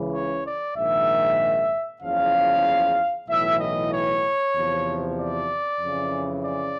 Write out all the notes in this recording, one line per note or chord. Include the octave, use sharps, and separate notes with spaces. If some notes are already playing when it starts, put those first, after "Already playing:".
Already playing: C#2 C#3 E3
C#5
D5
A#1 G#2 D#3 E5
F#1 E2 C#3 F3 F5
B1 A2 E3 E5
D#5
C#5
E2 C3 F3
D5
F2 C#3 E3
D5